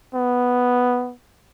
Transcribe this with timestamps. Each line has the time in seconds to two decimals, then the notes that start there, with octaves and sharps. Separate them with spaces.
0.15 B3